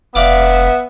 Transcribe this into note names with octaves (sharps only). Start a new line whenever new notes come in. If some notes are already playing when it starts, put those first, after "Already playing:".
F1 B3 D5 E5 F5 D6